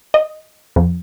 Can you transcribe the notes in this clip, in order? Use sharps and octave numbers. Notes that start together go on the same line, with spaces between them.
D#5
F2